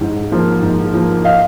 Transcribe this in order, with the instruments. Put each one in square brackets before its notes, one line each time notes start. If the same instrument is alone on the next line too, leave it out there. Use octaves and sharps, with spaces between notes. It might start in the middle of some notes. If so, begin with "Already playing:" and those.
[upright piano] G#2
F3 A#3
G#2
F3 A#3
D#5 F5